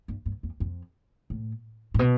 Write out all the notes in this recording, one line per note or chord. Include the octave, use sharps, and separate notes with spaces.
G2
G2
F2
F2
A2
A2
B2